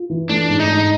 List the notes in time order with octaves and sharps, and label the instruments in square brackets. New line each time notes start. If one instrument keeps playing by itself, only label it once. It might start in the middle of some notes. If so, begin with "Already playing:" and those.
Already playing: [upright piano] F4
E3
[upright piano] A3 [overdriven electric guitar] D4
[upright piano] G#2
[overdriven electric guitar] D#4
[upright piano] G#2